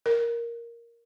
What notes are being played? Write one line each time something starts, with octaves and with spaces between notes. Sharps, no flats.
A#4